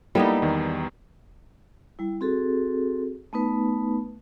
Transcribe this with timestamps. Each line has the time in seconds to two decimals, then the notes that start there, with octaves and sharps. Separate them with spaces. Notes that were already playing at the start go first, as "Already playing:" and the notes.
0.15 G3 A#3 B3 D#4 E4 A4
0.42 E2 D#3
1.99 G3 E4
2.21 C4 F#4 G#4 A4
3.33 A3 B3 D#4 B4